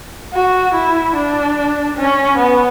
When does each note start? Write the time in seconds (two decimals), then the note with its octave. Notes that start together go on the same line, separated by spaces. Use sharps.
0.33 F#4
0.74 E4
1.15 D4
1.97 C#4
2.38 B3